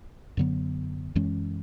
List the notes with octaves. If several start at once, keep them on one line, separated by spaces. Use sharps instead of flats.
F#2 D3 F#3 B3
F#2 E3 G#3 C#4